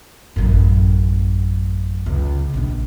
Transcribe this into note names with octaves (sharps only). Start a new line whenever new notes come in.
A1 F#2
C#2
A#1 D4